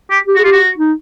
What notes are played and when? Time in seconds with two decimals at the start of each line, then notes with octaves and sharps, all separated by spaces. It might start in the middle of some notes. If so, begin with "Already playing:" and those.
0.11 G4
0.27 G4
0.35 F#4 G#4
0.44 F4 G4
0.52 F#4
0.78 D#4